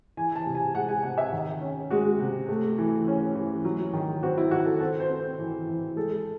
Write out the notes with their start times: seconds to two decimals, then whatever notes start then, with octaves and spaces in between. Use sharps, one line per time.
0.17 E3 G#5
0.36 A5
0.46 C3
0.55 G#5
0.75 G#3 F#5
0.89 G#5
1.03 C3 F#5
1.18 E5
1.32 D#3
1.61 C#4
1.90 G#3 F#4
2.19 C3
2.48 A3
2.78 E3
3.07 C#4
3.35 E3
3.65 F#3
3.93 D#3
4.23 C4 F#4
4.38 E4
4.51 D#3 F#4
4.66 A4
4.80 C4 A4
5.00 C5
5.10 C4
5.20 C5
5.39 E3
5.67 E3
5.96 G#3 A4